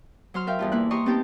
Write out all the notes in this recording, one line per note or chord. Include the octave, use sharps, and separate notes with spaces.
F#3 C5 C6 F6
A#4 E5 F5 G5
E2 G2 F4
A#3 E4 F#6
G4 D#5 A#5 C6 C#6
B3 C4 D#4 G4 C5 A5